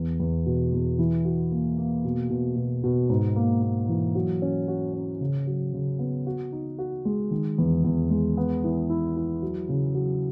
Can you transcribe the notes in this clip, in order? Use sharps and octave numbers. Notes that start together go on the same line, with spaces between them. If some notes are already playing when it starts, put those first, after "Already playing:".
Already playing: E2
E2
B2
E2
E3
F#4
A#3
A#3
B2
B2
B2
B2
G#2
A#3
A#3
E3
F#3
C#4
F#4
C#4
C#3
F#3
C#3
B3
F#4
D#4
F#4
G#3
D#3
E2
E2
G#3
B3
E3
E4
E4
F#3
C#3
F#3